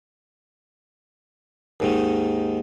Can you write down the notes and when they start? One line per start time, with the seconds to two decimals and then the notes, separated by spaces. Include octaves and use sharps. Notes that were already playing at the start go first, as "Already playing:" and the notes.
1.80 D#2 G#2 D#3